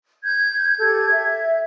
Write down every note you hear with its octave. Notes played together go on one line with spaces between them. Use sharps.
G6 G#6
G4 A4 G#6
E5